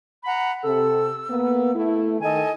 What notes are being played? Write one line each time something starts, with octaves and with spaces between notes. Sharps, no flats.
F#5 A#5 B5
C3 A4 E6
A#3 B3
A3 E4
D#3 A4 D#5 G#5